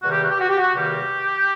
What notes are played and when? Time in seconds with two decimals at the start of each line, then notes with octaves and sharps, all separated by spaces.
0.01 E2 C3 D#3 G3 A#3 F#4
0.11 G4
0.21 F#4
0.30 G4
0.40 F#4
0.48 G4
0.58 F#4
0.74 E2 C3 D#3 G3 A#3 G4